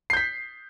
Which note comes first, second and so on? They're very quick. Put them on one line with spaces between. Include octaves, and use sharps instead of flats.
C7 G6 B6